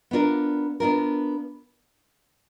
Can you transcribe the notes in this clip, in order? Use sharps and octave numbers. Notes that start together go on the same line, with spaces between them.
B3 D4 F4 A#4
B3 D4 F4 A#4